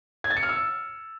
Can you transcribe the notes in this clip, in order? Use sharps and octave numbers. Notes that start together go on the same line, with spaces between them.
G#6
A6
C#7
F6
E6